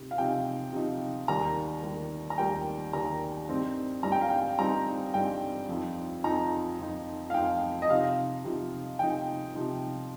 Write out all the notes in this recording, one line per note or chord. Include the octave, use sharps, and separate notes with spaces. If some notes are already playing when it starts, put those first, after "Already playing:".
Already playing: C3 D#4
F5
C3 F3 D#4 G5
C3 F3 D#4
D#2 D#3 G3 A#5
D#2 D#3 G3
A#5
D#2 D#3 G3 G5
D#2 D#3 G3 A#5
G2 G3 C4 D#4
G2 G3 C4 D#4 A#5
G5
F5
G5
G2 G3 C4 D#4 A#5
G2 G3 C4 D#4 G5
F2 F3 D#4
F2 F3 D#4 A#5
F2 F3 D#4
F5
F2 F3 D#4 G5
D#5
C3 F3 D#4 F5
C3 F3 D#4
C3 F3 D#4 G5
C3 F3 D#4